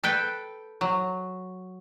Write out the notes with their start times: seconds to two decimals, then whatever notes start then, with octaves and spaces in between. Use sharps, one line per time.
0.04 A4 B4 G5
0.81 F#3